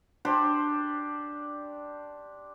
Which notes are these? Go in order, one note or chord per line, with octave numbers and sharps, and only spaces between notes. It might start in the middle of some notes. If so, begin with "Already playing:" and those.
D4 G4 C5